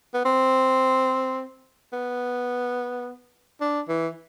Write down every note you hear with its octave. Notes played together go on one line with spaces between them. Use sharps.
B3
C4
B3
D4
E3